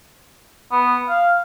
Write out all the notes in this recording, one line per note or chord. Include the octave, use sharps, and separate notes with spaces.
B3
F5